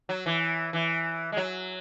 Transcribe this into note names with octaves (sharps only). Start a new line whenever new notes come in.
F#3
E3
E3
G#3
F#3